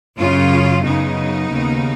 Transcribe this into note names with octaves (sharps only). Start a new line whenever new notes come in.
F#2 C#3 C#4 F4
F#2 C#3 B3 D#4
D#2 C#3